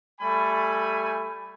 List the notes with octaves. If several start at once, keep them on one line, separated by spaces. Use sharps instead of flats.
G3 A3 G#5 B5